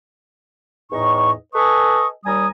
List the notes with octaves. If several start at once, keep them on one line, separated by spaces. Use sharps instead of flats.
E2 A2 D#4 D#5 C#6
A4 B4 D#5 G#5 C#6 D#6
D#2 G3 G#5 A#5 D#6